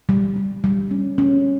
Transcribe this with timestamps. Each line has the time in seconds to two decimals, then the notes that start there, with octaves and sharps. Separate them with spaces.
0.09 G3
0.36 G3
0.64 G3
0.91 C#4
1.18 C#4